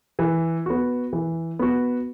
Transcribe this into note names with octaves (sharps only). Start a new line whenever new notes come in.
E3
B3 F#4
E3
B3 F#4